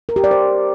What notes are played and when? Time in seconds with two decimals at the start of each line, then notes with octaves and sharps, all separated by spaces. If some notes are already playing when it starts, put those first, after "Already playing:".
0.09 A#4
0.16 G4
0.24 D5
0.31 C5